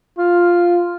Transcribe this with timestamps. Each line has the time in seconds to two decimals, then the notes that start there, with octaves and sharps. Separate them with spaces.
0.18 F4